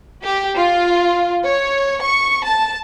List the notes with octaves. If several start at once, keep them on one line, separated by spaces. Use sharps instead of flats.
G4
F4
C#5
C#6
A5